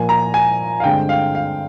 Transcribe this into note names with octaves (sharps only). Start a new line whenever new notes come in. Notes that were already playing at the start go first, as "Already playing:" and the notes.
Already playing: A#2 F3 A#3 G#5
A#5
G#5
F5
G2 D3 G#3 C4 G5
F5
F5